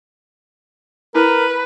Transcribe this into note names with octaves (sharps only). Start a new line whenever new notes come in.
E4 A#4 B4